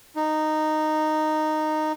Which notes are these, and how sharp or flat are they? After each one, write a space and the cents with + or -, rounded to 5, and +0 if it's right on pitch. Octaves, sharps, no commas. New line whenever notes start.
D#4 -10